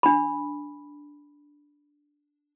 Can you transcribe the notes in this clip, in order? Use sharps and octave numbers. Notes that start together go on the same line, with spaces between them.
D4 B5